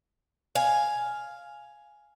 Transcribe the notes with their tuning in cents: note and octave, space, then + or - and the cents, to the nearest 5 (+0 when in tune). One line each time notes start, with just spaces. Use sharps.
F5 +0 G#5 +5